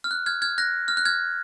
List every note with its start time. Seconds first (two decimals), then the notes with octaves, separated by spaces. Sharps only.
0.04 F6
0.11 F#6
0.26 F6 G#6
0.42 F6 G#6
0.58 F#6 A#6
0.88 F6
0.97 F#6
1.05 F6 G#6